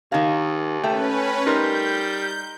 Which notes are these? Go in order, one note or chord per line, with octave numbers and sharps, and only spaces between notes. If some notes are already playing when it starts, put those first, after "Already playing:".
D#2 D#3 F5
A3 C#4 B4 G5
G3 D#4 A#4 C6 G6